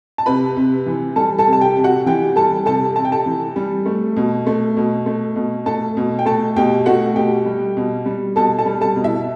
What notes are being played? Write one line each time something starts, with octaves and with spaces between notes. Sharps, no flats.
A5
C3 B4 B5
C3
E3
G3 A4 A5
A4 A5
C3
A5
G4 G5
C3
F#4 F#5
E3 G4 G5
G3 A4 A5
C3 A4 A5
C3 A5
G5
A4 A5
E3
G3
A3
B2
A3
B2
A3
B2
A3 A4 A5
B2
G5
A3 A4 A5
B2 G4 G5
A3 F#4 F#5
B2 G4 G5
G3
B2
G3
B2 A4 A5
A4 A5
G3
A4 A5
B2
E4 E5